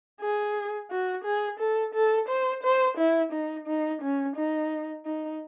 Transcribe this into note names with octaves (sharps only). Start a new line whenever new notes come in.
G#4
F#4
G#4
A4
A4
C5
C5
E4
D#4
D#4
C#4
D#4
D#4